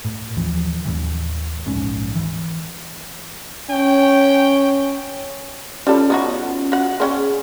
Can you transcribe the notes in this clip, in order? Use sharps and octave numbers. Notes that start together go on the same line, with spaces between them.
A2
D#2 E3 F3
D#2 A2 E3
D1 A#1 G#2 C#4
E3
C#4 G5
G3 C#4 F4 A4
B3 D#4 F#4
F#4 F#5
C4 C#4 G#4 G5